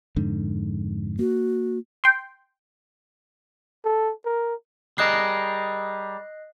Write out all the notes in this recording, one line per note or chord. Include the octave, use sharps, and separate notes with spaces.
F2 G#2 D3
A#3 F#4
G5 C6
A4
A#4
G3 G#4 A#4 D#5 F#6 C7